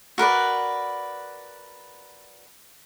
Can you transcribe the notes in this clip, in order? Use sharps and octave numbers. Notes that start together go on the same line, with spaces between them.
F#4 A#4 B4 D5